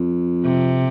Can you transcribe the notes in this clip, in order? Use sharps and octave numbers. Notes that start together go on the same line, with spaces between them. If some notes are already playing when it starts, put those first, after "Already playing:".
Already playing: F2
C3